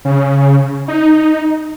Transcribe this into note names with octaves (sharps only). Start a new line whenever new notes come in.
C#3
D#4